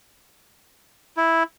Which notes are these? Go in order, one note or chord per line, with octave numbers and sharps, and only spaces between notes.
E4